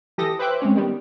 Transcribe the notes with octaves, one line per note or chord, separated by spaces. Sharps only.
E3 G4 A4 D#6 A#6
B4 C5 E5 G5 D6 F#6
G#3 C4 C#4 C#5
D#3 G3 B3